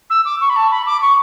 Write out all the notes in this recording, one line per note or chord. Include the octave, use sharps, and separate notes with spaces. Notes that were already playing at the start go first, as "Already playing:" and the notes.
E6
D6
C#6
B5
A5
B5
D6
C#6